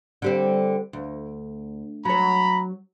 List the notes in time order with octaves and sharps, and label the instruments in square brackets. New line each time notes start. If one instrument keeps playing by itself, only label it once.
[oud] D3 G3 C4
D2
[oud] F#3 C#5 [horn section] A#5 B5